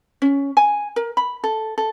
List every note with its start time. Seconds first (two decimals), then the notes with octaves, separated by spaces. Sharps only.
0.22 C#4
0.57 G#5
0.96 A#4
1.17 B5
1.44 A4
1.78 A4